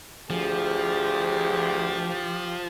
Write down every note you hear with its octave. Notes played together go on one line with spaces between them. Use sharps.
D2 F3 G4 G#4